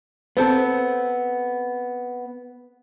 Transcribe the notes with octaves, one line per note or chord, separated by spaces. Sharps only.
B3 C4 A4